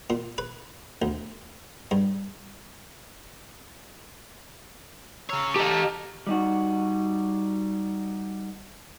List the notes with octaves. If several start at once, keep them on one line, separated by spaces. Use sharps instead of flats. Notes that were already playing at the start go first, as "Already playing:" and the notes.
A#2
B4
D2
G2
C#3 C#5 A#5 E6 F6
A3 G4 D#5 A5 A#5
G3 D#4 F#4